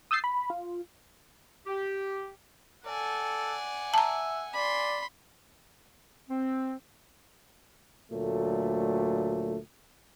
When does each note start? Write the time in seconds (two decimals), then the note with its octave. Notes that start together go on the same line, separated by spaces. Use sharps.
0.11 D#6 E6 G6 A6 C7
0.24 B5
0.50 F4
1.67 G4
2.86 A4 D5 F#5 G#5
3.94 E5 A5 A#5
4.54 D5 B5 C6
6.30 C4
8.11 D2 A#2 F#3 A3